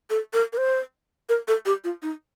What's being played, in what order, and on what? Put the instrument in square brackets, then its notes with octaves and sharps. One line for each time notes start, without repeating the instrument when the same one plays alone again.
[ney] A4
A#4
A#4
C5
A#4
A4
G4
F4
D#4